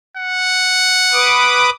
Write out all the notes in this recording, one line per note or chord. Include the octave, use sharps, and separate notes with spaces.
F#5
B4 D6 D#6